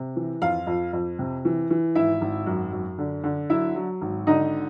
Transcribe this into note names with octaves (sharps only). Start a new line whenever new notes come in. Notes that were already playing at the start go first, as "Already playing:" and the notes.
Already playing: C3
E3
F2 F4 F5
F2
F2
C3
E3
E3
G#1 E4 E5
G#1
F#2
F#2
D3
D3
F#3 E4 E5
F#3
G#1
D3 D#4 D#5